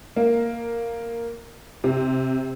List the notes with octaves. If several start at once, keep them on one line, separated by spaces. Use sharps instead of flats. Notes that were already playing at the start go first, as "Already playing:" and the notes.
A#3
C3